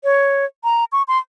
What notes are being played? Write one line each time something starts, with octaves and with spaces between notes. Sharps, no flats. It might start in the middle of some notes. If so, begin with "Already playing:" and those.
C#5
A#5
C#6
C6